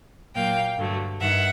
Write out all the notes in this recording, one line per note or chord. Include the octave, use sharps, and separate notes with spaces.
A#2 F#3 A#3 F5 G5
G2 D3 F#3 A3
G2 D#3 E5 F#5